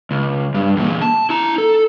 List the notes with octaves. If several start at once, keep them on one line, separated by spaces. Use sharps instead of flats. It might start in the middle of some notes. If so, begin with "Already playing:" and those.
C#2
G2
E2 A#2
A5
E4 A#5
A4